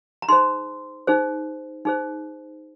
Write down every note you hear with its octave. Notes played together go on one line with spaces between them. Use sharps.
A#5
D#4 G#4 C5 C6
D#4 G#4 C5
D#4 G#4 C5